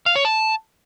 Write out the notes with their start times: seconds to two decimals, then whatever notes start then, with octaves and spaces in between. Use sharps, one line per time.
0.06 F5
0.16 C#5
0.25 A5